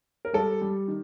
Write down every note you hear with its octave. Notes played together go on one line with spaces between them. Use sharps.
A#4
G3 A4
G3
D#3